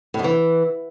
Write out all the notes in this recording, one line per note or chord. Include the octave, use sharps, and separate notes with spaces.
A2
F#2
E3